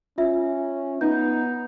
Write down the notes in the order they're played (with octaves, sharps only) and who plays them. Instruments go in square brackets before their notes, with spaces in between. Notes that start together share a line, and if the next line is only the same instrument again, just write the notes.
[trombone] C#4 [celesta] F4 E5
[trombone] B3 [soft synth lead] D#4 [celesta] G6